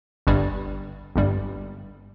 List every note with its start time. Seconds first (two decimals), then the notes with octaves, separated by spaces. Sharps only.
0.27 G1 G2 G3
1.16 G1 G2 G3